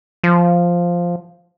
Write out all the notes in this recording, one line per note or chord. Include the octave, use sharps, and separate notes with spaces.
F3